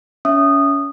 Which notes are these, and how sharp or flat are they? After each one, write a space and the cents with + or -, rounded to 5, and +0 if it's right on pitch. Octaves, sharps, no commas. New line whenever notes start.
C#4 +25 E5 +5 D#6 -15